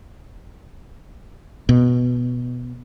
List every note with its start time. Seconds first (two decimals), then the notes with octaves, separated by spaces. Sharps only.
1.69 B2